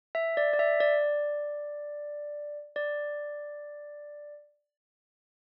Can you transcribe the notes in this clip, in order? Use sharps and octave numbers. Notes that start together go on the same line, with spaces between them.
E5
D5
D5
E5
D5
D5